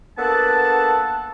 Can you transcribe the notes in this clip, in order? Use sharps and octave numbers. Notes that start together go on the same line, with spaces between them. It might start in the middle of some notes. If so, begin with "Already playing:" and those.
A#3 B3 D4 A4 F#5 A5